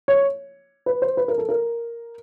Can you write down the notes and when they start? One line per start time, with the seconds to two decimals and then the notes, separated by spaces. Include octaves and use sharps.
0.08 C#5
0.86 B4
1.02 C5
1.17 B4
1.28 A#4
1.38 A4
1.49 A#4